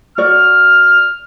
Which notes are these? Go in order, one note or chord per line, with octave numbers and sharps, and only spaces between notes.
F#4 D5 F6